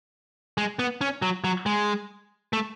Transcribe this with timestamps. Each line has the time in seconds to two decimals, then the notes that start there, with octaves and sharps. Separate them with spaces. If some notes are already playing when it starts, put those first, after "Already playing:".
0.58 G#3
0.79 B3
1.01 C#4
1.22 F#3
1.44 F#3
1.66 G#3
2.53 A3